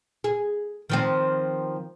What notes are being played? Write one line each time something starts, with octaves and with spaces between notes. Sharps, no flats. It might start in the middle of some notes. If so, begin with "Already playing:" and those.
G#4
D#3 F3 C4